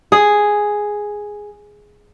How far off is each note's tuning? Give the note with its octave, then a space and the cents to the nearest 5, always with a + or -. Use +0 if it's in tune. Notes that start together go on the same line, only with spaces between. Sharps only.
G#4 +0